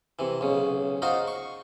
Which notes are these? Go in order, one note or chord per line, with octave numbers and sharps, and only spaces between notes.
C3 E3
B1 C#3
D#4 F4 F#4 C5 F5
C#6